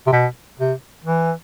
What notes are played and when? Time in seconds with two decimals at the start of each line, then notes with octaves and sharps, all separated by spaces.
0.07 C3
0.13 B2
0.59 C3
1.04 E3